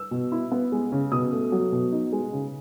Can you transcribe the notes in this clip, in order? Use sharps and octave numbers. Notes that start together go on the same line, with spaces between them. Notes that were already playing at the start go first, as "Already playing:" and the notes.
Already playing: E6
B2
E4
B3
G#3
C#3
B2 D#6
A3
F#3
B2
D#4
G#3
C#3